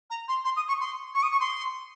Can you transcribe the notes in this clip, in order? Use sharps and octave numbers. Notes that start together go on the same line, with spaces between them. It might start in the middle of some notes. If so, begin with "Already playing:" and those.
A#5
C6
C6
D#6
C#6
C6
C#6
D#6
C#6
C6